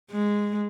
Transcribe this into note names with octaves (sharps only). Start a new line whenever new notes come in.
G#3